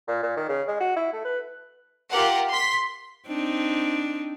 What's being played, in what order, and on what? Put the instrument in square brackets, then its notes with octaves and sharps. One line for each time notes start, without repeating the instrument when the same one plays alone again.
[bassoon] A#2
A#2
D#3
C#3
G#3
F#4
E4
A3
B4
[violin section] F4 G4 A#4 F#5
C6 B6
[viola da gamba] C4 D4 D#4